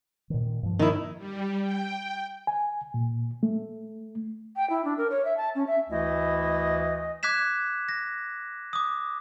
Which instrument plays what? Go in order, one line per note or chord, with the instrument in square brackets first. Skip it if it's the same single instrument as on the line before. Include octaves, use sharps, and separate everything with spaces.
[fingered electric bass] A#2 D#3
G2 F3
[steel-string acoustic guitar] D#3 E4
[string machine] G3
G5
[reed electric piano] G#5
A#2
A3
[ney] G5
E4
D4
A#4
C#5
E5
A5
C#4
E5
[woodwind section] D2 E3 A3 E4 D#5
[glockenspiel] D6 F#6 G#6 B6 E7
A#6
D6 D#6